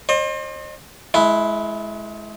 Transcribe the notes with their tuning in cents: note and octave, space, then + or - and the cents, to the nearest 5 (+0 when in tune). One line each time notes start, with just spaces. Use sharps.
C5 +35 D#5 -40
G#3 +30 E4 +0